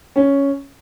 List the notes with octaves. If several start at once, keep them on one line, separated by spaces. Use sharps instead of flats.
C#4